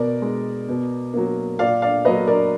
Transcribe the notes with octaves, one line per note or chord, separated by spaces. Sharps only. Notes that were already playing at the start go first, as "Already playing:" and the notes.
Already playing: B2 A#4 D5
G#3
B2
F#3 A#3
A#2 D5 F5
D5 F5
F#3 A#3 B4 D#5
A#4 D5